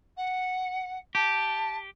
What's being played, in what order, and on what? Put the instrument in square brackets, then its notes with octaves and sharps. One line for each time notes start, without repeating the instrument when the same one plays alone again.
[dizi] F#5
[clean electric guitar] G4 [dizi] A5